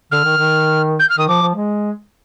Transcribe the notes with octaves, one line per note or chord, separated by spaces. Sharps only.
D3 F6
D#3
D#3
G6
F6
D#3 D#6
F3 D6
F3
G#3